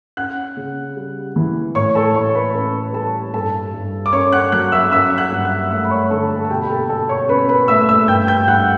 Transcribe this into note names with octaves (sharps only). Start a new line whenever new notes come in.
C#4 F#5 F#6
C#3
G3
E3
A2 C#5 C#6
A4 A5
A2 C#5 C#6
B4 B5
C#4 B4 B5
G3 A4 A5
G2 A4 A5
G2
D6
C#4 C#5 C#6
F#5 F#6
F#3 F#5 F#6
E5 E6
C#4 E5 E6
F#5 F#6
G2
F#5 F#6
A3 E5 E6
B5
C#5 C#6
D3 A4 A5
A4 A5
A5
B2 G4 G5
B5
A4 A5
B2 A4 A5
C#5 C#6
C#4 B4 B5
B4 B5
A3 E5 E6
E5 E6
G2 G5 G6
G5 G6
G2 F#5 F#6